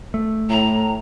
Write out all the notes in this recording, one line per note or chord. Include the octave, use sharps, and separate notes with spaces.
A3
A2 A#5